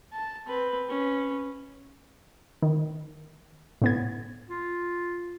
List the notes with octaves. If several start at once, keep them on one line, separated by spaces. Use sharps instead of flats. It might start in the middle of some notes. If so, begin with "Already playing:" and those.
A5
C4 B4
C#4 B4
D#3
A2 B3 G#6
F4